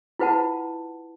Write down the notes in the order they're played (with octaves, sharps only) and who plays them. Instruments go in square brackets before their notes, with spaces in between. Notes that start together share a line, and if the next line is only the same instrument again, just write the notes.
[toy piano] E4 F4 B4 F#5 A5